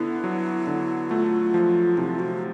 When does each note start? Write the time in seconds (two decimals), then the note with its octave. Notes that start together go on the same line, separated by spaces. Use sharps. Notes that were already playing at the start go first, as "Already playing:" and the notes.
Already playing: D3 B3 E4
0.24 F#3
0.67 D3
1.10 A3 F4
1.54 F3
1.97 C3 E4
2.19 F#4